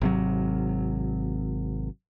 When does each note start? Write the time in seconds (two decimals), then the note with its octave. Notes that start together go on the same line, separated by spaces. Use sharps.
0.01 G#1 C3 F#3